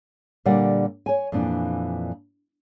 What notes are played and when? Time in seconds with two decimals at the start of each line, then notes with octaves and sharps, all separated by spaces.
0.46 A#2 D3 G3 D5 F#5
1.06 C#5 G#5
1.32 F2 A#2 E3 D4